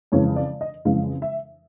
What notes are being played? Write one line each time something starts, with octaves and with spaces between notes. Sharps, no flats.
F2 C#3 E3 G#3 C#5
D5
D#5
F2 C#3 E3 G#3 F5
E5